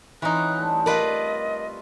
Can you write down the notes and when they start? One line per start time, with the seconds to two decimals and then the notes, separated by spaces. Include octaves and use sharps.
0.22 E3 C4 C#4 D#4 F#4 F#6
0.57 G3 A3 A4
0.86 F4 A#4 B4 D5 D#5